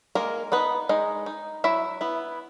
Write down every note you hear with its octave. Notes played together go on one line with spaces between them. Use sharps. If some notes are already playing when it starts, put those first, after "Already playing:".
G#3 A#3 A#4
B3 D#4 B4
G#3 D#4 D#5
D#4
F#3 E4 E5
B3 E4